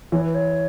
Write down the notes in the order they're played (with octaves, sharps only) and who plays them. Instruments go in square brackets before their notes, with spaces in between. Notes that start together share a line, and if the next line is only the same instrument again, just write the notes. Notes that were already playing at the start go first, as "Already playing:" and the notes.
[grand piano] E3 [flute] C#5
[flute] B4
C#5